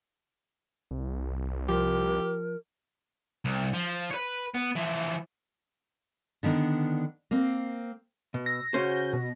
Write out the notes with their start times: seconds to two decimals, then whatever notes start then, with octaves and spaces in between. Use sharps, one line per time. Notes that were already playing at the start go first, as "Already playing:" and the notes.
0.91 C2
1.69 F3 G4 A#4
3.45 C2
3.73 F3
4.11 B4 C#5
4.54 B3
4.75 E3 F3
6.43 D3 D#3 B3 D4
7.31 A#3 C4
8.34 B2
8.46 E6 A#6
8.74 C#3 C#4 F#4 C5 G6
9.13 B2